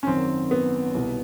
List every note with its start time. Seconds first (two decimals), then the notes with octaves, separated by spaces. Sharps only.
0.03 C#4
0.07 G#1 F#2 D#3 C4
0.51 B3
0.94 C2 B2